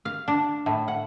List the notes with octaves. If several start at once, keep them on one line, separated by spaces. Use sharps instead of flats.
F5
D4
A2
F#5